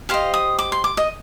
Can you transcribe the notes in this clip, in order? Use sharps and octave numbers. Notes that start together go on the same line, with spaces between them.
G4 C5 D#5 F5
D#6
D6
C6
D6
D#5